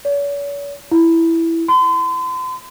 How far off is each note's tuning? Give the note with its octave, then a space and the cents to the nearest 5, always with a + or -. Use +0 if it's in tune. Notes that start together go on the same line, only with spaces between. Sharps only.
C#5 +45
E4 +5
C6 -40